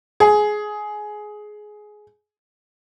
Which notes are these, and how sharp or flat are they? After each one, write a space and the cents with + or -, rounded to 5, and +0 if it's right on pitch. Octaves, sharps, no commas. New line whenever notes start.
G#4 +15